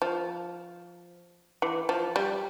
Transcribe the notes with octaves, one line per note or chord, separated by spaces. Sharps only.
F3
E3
F3
G3